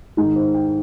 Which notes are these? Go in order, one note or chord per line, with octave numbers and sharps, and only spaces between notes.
G#2 D#3 D#4
C5
G5